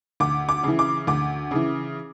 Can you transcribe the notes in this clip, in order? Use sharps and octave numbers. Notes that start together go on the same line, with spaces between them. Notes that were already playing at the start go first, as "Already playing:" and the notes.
D2 D6
D6
C#3 E3
D6
D2 D6
C#3 E3